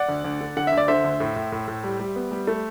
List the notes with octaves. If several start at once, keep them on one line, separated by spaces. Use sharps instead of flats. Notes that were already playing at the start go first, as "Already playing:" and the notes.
Already playing: D5 F#5
D2
D2
D3
D3 F#5
E5
D2
D5
D3 C5 E5
D2
A2
A2
A2
A2
G3
G3
B3
G3
A3